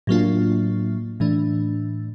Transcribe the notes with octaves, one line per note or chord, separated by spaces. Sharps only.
A2 F#3 A#3 D4 F4
A2 E3 A3 D4